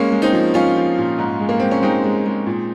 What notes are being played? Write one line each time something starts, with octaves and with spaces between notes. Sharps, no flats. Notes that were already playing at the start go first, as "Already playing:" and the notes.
Already playing: G#3 A#3 C#4
G#3
C4 D#4
F3
F3 C#4 F4
F3
A#2
G#2
G#3
A#3
G#3 C4
C#4
G#3 C4 D#4
G#3
G#3
A#2